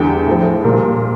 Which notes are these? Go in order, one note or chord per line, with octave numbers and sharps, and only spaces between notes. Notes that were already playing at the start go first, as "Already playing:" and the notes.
Already playing: E2 D3 G3 G5
A2 F3
A#2 G3 A#4